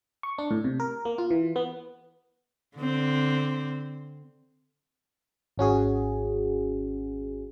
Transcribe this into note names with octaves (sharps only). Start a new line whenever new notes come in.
C#6
D4
A2
C3
A#4
A#3
F4
E3
B3
D3 C4
G#1 C#4 F#4 G#4